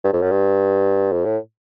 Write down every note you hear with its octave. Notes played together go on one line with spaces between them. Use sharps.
G2
F2
F#2
G2
F2
A2